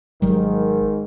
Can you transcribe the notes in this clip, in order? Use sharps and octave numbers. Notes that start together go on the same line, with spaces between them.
G#1 G#2 D#3 F#3 G3 A#4